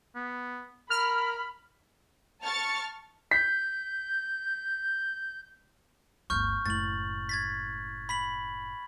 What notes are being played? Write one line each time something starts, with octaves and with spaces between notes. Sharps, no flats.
B3
A#4 B5 F6
A5 C#6 F6 A6 C#7
G6 B6
G1 D2 C#6 F6 G6
F#1 A2 A6 F#7
G#6 A6 B6
B5 B6 F#7